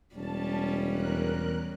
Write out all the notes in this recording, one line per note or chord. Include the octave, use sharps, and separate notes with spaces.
E1 G3 C#4 A5
E2 A#4 F#6